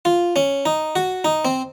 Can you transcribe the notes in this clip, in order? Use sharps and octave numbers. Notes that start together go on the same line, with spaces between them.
F4
C#4
D#4
F#4
D#4
C4